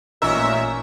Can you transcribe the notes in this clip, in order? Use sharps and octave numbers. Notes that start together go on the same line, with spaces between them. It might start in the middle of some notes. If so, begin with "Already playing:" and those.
A1 A#2 C#4 D#4 A#4 E5